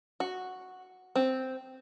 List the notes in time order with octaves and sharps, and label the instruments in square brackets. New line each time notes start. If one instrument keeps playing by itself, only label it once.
[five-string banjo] F#4
C4